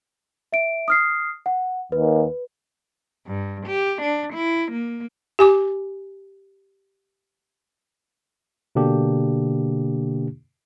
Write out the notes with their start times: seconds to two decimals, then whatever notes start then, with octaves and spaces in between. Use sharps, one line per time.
0.53 E5 D7
0.88 D#6 F6 C7
1.46 F#5
1.92 D#2 B4
3.26 G2
3.66 G4
4.01 D4
4.33 E4
4.71 A#3
5.39 G4 G#5 D6
8.75 B2 D3 A#3 D4 G4